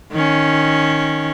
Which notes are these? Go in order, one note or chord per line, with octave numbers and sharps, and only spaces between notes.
D#3 C#4